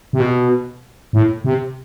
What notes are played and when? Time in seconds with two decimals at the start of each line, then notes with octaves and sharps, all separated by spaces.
0.13 C3
0.20 B2
1.13 A2
1.44 C3